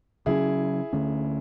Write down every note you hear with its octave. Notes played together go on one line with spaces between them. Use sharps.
C#3 F#3 C#4 E4 G#4
D2 D3 A3 C#4